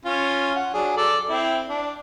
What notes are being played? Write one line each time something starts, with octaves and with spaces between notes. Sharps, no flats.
C#4 F4
F#5
F#3 D4 G#4
A4 D5
C4 E4
D4